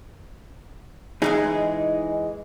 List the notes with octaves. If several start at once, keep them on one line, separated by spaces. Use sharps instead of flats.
E3 G3 G#3 D#4 G#4